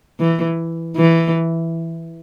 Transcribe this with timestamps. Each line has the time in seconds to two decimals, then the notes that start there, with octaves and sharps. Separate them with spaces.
0.20 E3
0.96 E3